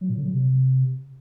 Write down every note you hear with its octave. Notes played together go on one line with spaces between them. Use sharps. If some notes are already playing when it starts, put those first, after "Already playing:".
F#3
A#2
D3
F#3
C3